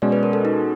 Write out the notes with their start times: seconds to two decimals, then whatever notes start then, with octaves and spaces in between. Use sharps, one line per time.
0.02 B2 G#3 C#4 D5
0.12 B4
0.23 A#4
0.33 A4
0.45 D#4